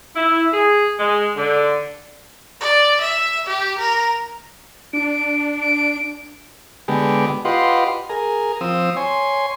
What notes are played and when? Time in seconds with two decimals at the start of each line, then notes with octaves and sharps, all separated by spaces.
0.15 E4
0.53 G#4
0.98 G#3
1.36 D3
2.60 D5
3.01 E5
3.47 G4
3.78 A#4
4.93 D4 D7
5.60 D7
6.88 D3 G#3 B3 G4
7.45 F4 G4 B4 D#5 F#5 C6
8.09 G#4 A#4
8.61 F3 C4 D#6 E6
8.97 C#5 G#5 C6